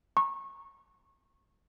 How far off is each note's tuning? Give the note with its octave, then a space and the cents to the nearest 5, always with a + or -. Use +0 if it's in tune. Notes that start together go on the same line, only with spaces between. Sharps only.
A#5 +0 C#6 -25